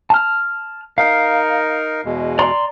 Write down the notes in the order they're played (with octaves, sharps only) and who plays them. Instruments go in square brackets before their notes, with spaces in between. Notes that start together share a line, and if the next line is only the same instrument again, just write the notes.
[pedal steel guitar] A5 F6
[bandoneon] D#4 A#4 [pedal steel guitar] F5
[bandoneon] E2 B2 G#3
[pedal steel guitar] D5 A#5 C6